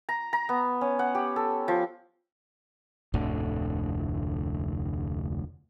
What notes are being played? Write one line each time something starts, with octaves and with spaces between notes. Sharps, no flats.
A#5
A#5
B3
C#4
F#5
G4
A4
F3
F1 D2 A2 D3